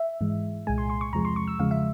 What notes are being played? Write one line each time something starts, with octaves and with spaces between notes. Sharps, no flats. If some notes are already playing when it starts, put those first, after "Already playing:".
Already playing: E5
G#2 E3 G#3
C2 A#2 G#3 G#5
C6
C6
C#6
E2 C3 F3 G#3 A#5
C6
C#6
E6
E2 C#3 F3 G#3 F5
E5